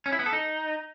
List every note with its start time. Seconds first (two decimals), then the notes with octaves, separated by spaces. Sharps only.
0.06 C#4
0.12 E4
0.19 B3
0.26 A4
0.33 D#4